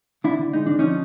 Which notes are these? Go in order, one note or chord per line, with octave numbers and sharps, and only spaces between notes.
D3 D4 E4
D3
G#3 D#4
D3 D4
F3 C#4 D#4